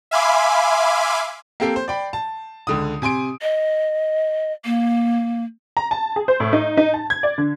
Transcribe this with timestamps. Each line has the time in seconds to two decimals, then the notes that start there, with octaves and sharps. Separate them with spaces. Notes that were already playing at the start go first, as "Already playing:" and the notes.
0.11 E5 F5 G#5 B5 C6 D6
1.60 A#3 C4 G4 A4 G5 C7
1.76 C5
1.88 D5 G5 B5
2.13 A5
2.67 C#2 D3 D#6
3.02 C3 G#5 C6 D7
3.42 D#5
4.65 A#3
5.77 A#5
5.91 A5
6.16 G#4
6.28 C5
6.40 A2
6.53 D#4
6.77 D#4
6.94 A5
7.10 G#6
7.23 D5
7.38 D3